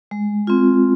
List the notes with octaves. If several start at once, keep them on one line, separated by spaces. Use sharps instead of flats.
G#3
C4 F4